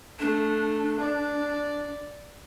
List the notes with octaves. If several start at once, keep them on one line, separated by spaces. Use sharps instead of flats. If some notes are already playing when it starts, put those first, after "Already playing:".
A3 D4
D5